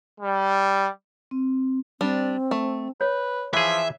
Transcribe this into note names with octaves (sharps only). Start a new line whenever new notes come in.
G3
C4
G3 C4 D4
A3
B4 C#5
E3 F3 G#4 E5